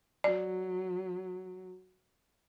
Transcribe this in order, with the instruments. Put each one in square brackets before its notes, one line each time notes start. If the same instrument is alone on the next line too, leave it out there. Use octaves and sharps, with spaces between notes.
[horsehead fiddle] F#3 [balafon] D5